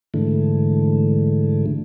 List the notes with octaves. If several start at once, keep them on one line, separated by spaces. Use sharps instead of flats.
G#2 D3 E3 A3